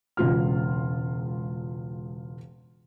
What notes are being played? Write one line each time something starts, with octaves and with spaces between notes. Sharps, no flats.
E1 C#2 F4 F6